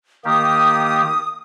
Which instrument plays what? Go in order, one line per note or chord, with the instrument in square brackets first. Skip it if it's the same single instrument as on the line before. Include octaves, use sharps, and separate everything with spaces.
[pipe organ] D#3 A#3 G4 [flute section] D#6